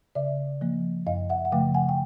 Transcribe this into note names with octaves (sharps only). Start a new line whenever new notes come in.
C#3 D5 E5
F3 A#3
F#2 D#5 F5
E5 F#5
F#5
C#3 F3 A3 F5 G5
F#5 G#5
G5